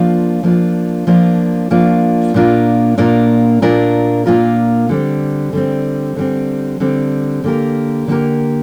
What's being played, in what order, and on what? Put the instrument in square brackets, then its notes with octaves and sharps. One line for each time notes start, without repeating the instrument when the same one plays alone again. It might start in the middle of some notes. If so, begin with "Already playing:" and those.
Already playing: [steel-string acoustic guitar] F3 A#3 D4 F4
F3 A#3 D4 F4
F3 A#3 D4 F4
F3 A#3 D4 F4
A#2 A#3 D4 F4 A#4
A#2 A#3 D4 F4 A#4
A#2 A#3 D4 F4 A#4
A#2 A#3 D4 F4 A#4
D3 G3 C4
D3 G3 C4
D3 G3 C4
D3 G3 C4
D3 A#3 G4 A#4
D3 A#3 G4 A#4